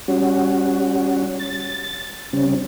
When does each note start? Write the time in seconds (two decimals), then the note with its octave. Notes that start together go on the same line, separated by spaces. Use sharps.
0.08 G3 C#4 F#4
1.39 A6
2.33 C#3 G3 C4 C#4